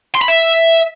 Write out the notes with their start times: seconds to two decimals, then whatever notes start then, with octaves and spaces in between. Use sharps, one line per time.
0.15 C6
0.21 B5
0.28 E5